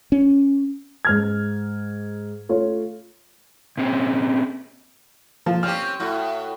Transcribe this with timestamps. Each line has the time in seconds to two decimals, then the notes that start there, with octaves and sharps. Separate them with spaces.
0.12 C#4
1.05 G#2 F6 G#6
2.49 A3 F4 C#5
3.77 A#2 C4 C#4
5.46 F3
5.63 C4 C#4 G4 F6
6.00 A2 F#4